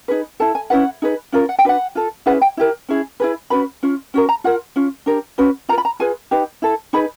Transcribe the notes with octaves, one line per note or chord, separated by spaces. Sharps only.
D#4 G#4 B4
E4 A4 A5
G#5
C#4 E4 G#4 B4 F#5
D#4 G#4 B4
C#4 F4 A#4
F#5
G5
D4 F#4 B4 F#5
F4 A4
C#4 E4 G#4 B4 F#5
G5
E4 G4 A#4
C#4 E4 G#4
E4 G#4 B4
C#4 F#4 B4 B5
C#4 F4
C#4 F#4 A#4
A#5
F4 A#4 F#5
C#4 F4
D4 G4 A#4
C#4 F#4 B4
F4 A#4 A#5
B5
A#5
F4 G#4 B4 G#5
D#4 G4 B4
E4 A4
D#4 G#4 B4 B5